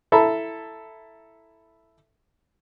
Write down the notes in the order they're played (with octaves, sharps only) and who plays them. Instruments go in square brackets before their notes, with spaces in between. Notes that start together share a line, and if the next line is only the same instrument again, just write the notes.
[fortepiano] E4 A4 E5 A#5 B5